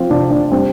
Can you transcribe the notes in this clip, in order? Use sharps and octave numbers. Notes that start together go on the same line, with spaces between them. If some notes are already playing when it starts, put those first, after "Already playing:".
Already playing: F3 C4 F4
C3 D4
D4
G3 C4